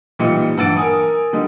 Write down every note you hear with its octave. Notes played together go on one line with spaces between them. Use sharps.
A#2 E3 G3 D#4 G5 C#7
G2 E3 F#5 E6 A6 D7
A#4 G#5 D#6
D3 G3 D#4